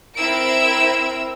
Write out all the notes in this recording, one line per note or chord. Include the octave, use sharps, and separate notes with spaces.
C4 E4 A#4 E6 D7